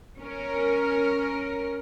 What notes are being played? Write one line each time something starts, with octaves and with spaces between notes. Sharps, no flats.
C#4 A#4